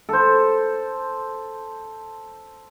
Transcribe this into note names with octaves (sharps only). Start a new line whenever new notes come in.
A4 C5